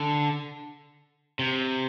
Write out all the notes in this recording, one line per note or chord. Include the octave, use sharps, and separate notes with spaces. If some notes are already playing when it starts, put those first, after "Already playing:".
Already playing: D3
C3